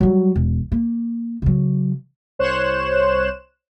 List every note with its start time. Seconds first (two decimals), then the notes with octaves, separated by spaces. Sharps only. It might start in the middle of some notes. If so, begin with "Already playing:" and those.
0.01 F#3 G3
0.36 E1
0.72 A#3
1.42 C#3 F#3
2.39 C2 C5 C#5 F#6 E7